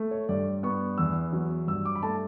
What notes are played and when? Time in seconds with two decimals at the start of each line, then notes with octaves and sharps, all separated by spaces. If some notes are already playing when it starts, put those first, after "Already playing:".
Already playing: A3
0.11 C#5
0.29 G2 D5
0.63 B3 C#6
0.98 E2 E6
1.33 F#3
1.67 G2 E6
1.85 D6
1.95 B5
2.03 A3 A5